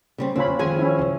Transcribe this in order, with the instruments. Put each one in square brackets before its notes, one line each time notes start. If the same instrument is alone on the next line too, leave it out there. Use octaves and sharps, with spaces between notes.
[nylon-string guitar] C#3 G3 C4
[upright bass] C#3 [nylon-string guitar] C4 [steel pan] C#4 F4 B5
[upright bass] F2
[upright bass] D#3 G#3 [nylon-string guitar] F3 C4 G#4 [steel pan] G#5
[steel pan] C#4 E4
[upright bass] G2 C#3